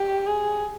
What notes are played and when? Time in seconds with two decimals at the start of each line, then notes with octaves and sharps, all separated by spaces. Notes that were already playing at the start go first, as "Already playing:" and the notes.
Already playing: G4
0.27 G#4